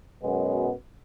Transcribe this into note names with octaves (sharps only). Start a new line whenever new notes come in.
F#2 B2 F#3 G#3 B3